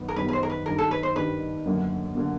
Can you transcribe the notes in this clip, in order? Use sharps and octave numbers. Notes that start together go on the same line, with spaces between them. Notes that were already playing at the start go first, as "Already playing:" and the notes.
Already playing: F#2 D#3 B3
A#4
F#2 D#3 G3 B3 B4
B4
C5
A#4
B4
G2 D#3 G3 A#4
A4
B4
C5
G2 D#3 G3 B4
F#2 D3 F#3 A#3
D3 F#3 A#3